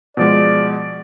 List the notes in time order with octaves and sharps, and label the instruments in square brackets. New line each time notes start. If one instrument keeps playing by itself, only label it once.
[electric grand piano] B2 F3 G#3 [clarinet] D5